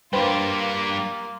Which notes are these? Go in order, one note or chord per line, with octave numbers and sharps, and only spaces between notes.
G3 A#3 D4 F4 B4 C5 G5